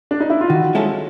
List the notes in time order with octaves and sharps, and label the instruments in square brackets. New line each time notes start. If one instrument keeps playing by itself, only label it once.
[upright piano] D4
D#4
E4
F4
[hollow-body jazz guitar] D#3 [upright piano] F#4
[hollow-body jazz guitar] G#3 C#4 E4 A4